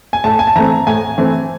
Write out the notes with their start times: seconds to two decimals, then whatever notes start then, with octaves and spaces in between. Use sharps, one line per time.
0.13 G#5
0.24 A2 A5
0.39 G#5
0.47 A5
0.55 E3 A3 C4 A#5
0.87 A2 G#5
1.18 E3 A3 C4